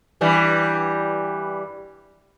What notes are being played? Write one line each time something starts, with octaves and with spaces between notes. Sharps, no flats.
G2 E3 G3